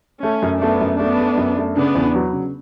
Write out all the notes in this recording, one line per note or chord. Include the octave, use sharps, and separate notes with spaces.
A3 C#4
F#2
A3 B3 D4
F#2
A3 B3 D4
A3
F#2
A3
C#3 B3 D4
E2
F#3
C#3